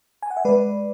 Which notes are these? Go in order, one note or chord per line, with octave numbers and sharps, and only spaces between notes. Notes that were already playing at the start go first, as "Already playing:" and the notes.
G#5
F#5
E5
G#3 B4 D5